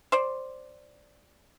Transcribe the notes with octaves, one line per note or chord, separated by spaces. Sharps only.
C5 D5